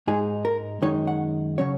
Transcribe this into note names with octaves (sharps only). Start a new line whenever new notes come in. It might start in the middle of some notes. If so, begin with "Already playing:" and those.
G#2 G#3 D#4 G#4
A#4
F#2 D#3 G#3 D#4 C#5
F#5
C#3 F#3 C#4 C#5